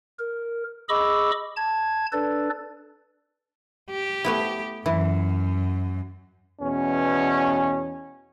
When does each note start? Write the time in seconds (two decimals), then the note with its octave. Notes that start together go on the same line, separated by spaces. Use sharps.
0.19 A#4
0.89 G#4 D#5 B5 C#6 D6 E6
1.56 A5 G#6
2.13 D4 A4 B4 D5
3.90 G4
4.24 A3 B3 E4
4.86 F#2 E3 E4
6.60 E2 B2 C#4